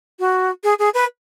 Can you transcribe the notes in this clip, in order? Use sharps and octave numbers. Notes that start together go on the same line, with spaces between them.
F#4
G#4
G#4
B4